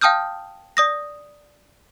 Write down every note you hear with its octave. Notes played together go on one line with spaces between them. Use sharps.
F5 G5 A5 D#6 F6 G6
D5 D#6 A#6